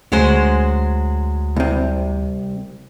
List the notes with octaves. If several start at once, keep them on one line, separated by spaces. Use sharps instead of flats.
D2 F#3 G#3 C5
C2 C3